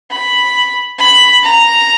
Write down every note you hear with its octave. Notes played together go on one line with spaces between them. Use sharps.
B5
B5
A#5